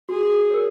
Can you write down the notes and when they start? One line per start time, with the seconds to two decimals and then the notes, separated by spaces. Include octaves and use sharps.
0.09 F#4 G#4
0.50 A#4 C#5